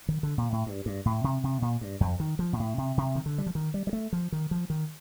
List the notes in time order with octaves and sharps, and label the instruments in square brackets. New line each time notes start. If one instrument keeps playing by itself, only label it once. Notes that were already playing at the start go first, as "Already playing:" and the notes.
[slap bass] D#3
D3
A#2
A2
G2
G2
A2
C3
C3
A#2
G2
F2
D#3
F3
A#2
A2
C3
C3
D#3
D3
G3
F3
D#3
G3
G3
A3
F3
D#3
F3
D#3